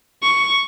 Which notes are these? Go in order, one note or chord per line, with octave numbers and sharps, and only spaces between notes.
C#6